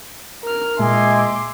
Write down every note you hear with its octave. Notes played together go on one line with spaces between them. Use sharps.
A#4 F6
A#2 G#3 D#5 E5 G#5 C6 D6